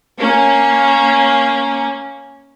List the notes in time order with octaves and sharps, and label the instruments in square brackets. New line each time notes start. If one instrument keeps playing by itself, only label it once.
[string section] A#3 C#4